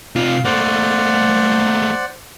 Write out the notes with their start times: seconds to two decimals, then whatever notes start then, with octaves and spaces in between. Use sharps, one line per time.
0.16 C3 F4 F5
0.45 A3 A#3 C5 D5 F#5